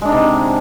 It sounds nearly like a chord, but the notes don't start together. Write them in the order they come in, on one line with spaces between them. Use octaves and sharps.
G#3 D4 D#4 C3